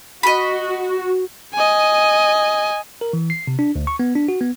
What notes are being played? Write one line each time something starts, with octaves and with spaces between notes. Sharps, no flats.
F#4 D#5 B5
D#5 G#5
A#4
E3
C7
C3
D4
D2
C#6
B3
D4
F#4
B3